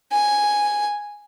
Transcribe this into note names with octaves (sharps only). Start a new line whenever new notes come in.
G#5